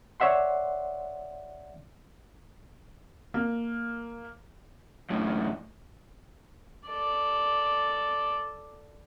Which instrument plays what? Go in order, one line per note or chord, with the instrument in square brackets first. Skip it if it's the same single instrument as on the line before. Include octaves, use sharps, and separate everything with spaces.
[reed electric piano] C#5 D5 E5 F#5 C6
[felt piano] A#3
[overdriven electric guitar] F#2 A2
[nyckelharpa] A4 D5